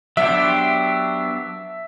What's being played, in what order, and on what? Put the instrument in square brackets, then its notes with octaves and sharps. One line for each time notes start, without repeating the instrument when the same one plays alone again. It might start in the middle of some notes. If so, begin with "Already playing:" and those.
[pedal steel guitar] F#3 B3 D4 G4 C5 [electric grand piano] E5